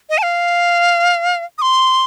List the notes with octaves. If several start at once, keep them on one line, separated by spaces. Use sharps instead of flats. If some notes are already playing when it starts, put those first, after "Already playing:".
D#5
A5
F5
D#6
C6